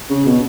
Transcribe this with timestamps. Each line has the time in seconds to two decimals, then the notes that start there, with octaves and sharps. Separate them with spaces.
0.10 C#3
0.26 B2